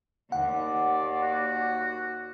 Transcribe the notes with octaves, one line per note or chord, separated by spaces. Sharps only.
D#2 D5 F#5
F#4